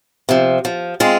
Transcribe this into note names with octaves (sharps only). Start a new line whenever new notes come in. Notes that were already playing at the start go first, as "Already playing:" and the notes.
C3 F3
F3
G#3 C4 F4